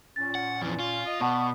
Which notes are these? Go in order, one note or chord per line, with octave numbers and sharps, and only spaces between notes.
A#2 C#4 A6
F#5
F2 E3
F4
D#5
B2 D5 F#5 A5 B5 C#6 D#6